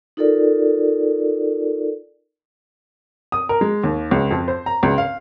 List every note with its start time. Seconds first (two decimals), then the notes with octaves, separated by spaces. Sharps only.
0.17 D#4 F4 A4 A#4 D5
3.32 D#6
3.49 A#4
3.61 G#3
3.84 D#2
4.11 C#2
4.31 F2
4.48 C5
4.66 A#5
4.83 C#2
4.98 F5